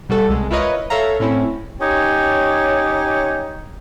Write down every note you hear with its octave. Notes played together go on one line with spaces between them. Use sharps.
B2 G3 F#4 A4
C2 G#3
E4 F4 A#4 B4 C#5 D#5
A4 C#5 E5 F5 A#5
A2 C4 C#4 E4
C#4 D#4 G4 C#5